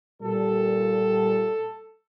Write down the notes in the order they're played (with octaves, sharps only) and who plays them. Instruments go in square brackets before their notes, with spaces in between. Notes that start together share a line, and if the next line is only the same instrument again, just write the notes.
[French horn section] A#2 G3 [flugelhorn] A4